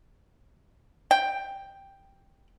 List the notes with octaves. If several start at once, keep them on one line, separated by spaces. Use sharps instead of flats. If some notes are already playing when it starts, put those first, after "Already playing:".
G5